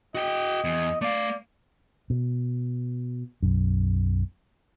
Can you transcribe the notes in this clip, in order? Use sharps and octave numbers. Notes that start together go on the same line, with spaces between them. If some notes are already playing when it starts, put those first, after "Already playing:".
F#4 D#5 G5
E2
A3 D5 F5
B2
B1 F#2